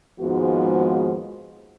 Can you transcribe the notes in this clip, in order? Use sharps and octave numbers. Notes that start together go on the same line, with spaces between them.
D#2 G#2 F3 G#3 B3 F#4